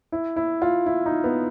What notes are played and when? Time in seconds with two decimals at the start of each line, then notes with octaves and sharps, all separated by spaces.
0.12 E4
0.36 E4
0.62 F4
0.86 E4
1.06 D#4
1.24 B3